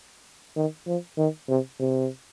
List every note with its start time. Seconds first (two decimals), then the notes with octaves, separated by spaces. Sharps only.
0.56 D#3
0.87 F3
1.18 D#3
1.49 C3
1.80 C3